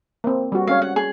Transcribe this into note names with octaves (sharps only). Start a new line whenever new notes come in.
A#3 C4
G3 F#4
G#3 C#4 C#5 F5
F#5
G#4